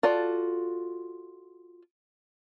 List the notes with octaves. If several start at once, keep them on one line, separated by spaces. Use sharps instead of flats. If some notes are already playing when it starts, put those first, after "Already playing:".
F4 F#4 A4 D5